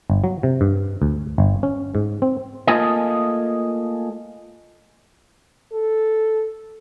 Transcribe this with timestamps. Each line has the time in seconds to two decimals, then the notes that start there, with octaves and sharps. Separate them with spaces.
0.10 G1
0.24 F#3
0.43 C3
0.61 G2
1.02 D2
1.38 G1
1.63 C#4
1.95 G#2
2.22 C4
2.67 A3 A#3 F4 G#4 A4 D#5
5.73 A4